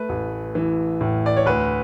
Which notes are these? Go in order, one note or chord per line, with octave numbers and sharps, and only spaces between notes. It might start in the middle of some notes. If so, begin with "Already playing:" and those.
Already playing: A3 B4
A1
E3
A2
D5
C#5
D2 B4